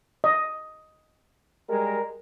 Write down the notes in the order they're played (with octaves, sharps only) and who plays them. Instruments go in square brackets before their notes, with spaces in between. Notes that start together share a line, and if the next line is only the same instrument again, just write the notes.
[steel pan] D#5
[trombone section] G3 G#3 A#4